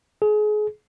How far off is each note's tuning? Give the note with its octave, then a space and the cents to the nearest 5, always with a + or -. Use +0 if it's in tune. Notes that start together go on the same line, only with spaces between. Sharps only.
G#4 +30